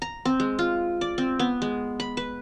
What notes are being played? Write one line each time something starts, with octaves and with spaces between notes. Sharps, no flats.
A#5
C4
G#3
F4
D5
C4
B3
G#3
B5
B4